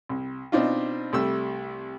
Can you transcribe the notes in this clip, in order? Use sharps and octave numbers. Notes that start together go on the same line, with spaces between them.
C2
B2 C4 D4 D#4 F4
C2 G3 A3 E6